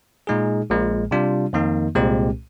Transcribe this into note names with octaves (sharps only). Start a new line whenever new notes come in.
A#2 G#3 D#4 G#4
A#1 A#2 G#3
C3 G3 D4 F4
F2 D#3 A#3 D#4
C2 A#2 G#3 C4 G4